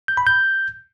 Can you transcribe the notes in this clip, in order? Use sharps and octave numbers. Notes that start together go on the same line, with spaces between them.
G6
B5
G6